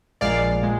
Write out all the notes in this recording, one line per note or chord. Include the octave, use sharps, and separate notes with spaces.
A#1 A#2 G#3 D5 F5
A#2 G#3